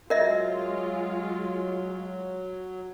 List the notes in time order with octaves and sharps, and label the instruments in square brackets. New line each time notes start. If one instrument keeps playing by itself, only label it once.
[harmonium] F#3 [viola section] G#3 F4 [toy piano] A#4 D#5 E5